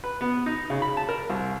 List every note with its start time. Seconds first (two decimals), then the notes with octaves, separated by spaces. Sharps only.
0.04 B4
0.21 B3
0.46 D#4
0.70 C#3
0.82 B5
0.97 A5
1.09 A#4
1.30 C2